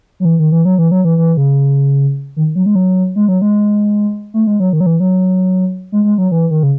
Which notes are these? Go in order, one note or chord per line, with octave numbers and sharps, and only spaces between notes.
F#3
E3
D#3
E3
F#3
E3
F#3
E3
E3
C#3
D#3
F#3
G#3
F#3
G#3
F#3
G#3
A3
G#3
F#3
D#3
F#3
E3
F#3
G#3
G#3
F#3
E3
D#3
C#3